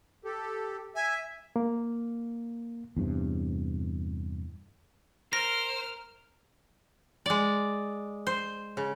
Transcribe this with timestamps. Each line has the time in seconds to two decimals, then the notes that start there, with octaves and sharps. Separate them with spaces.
0.25 G4 A4
0.96 E5 G#5
1.56 A#3
2.97 E2 G2 C3
5.33 A#4 C5 F6 A#6
7.26 G#3 D5
8.27 C5
8.77 C#3